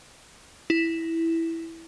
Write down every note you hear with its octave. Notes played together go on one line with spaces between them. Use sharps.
E4